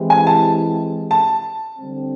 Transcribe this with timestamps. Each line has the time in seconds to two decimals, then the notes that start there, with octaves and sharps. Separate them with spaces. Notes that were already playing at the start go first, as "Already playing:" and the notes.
Already playing: E3 G#3 C4 E4 G4
0.10 G#5
0.27 A5
1.11 A5
1.78 D3 G3 C4